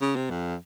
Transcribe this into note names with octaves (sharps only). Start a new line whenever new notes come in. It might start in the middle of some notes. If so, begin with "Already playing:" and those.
C#3
C3
F2